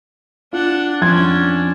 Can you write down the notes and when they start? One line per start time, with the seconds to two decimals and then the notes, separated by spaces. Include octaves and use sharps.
0.53 D4 F4 F#5
1.01 F2 C#4 D4 C6 G#6